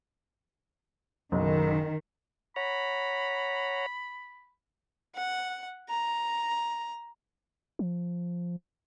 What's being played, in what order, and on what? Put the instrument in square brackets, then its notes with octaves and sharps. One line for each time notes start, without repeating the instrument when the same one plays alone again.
[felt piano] F#1 B1 [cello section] D#3
[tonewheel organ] C#5 F#5 A#5 [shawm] B5
[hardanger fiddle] F#5
A#5
[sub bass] F3